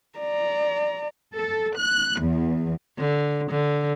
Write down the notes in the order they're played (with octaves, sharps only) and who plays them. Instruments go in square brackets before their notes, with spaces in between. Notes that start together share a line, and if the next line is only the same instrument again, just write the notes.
[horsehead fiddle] D5 A#5
[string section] A4
F#6
E2
[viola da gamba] D3
D3